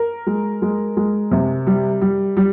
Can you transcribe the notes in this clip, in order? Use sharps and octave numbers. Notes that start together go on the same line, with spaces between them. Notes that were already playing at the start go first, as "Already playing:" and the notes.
Already playing: A#4
G#3
G#3
G#3
C3
G3
G3
G3